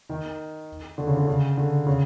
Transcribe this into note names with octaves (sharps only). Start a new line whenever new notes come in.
D#3
D3
C#3
D3
C#3
D3
C#3